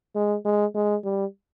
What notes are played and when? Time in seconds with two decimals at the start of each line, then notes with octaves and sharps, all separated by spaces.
0.15 G#3
0.45 G#3
0.75 G#3
1.04 G3